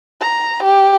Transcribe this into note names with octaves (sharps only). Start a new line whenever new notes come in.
A#5
G4